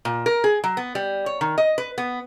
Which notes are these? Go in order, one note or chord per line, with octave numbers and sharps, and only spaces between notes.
A#2
A#4
G#4
F#3
B3
G3
C#5
D#3
D#5
B4
B3